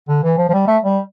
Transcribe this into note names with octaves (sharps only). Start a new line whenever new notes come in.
D3
E3
F3
F3
G3
A3
G3